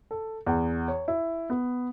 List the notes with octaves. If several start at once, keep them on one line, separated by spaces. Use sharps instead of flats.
A4
E2
C#5
E4
B3